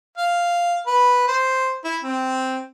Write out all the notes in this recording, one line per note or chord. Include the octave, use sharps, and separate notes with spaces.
F5
B4
C5
E4
C4